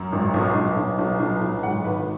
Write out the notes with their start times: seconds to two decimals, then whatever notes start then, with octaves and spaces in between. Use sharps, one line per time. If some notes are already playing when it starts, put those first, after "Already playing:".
Already playing: F#2
0.12 G#1
0.34 B1
0.55 B1
0.77 B1
0.99 B1
1.20 B1
1.42 B1
1.63 G#1 F#5
1.85 D#3 B4